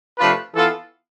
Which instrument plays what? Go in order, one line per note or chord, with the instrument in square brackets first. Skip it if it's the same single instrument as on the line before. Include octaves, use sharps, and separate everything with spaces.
[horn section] C3 F3 A3 D4 F4 [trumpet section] B4
[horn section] E3 B3 F4 [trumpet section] A4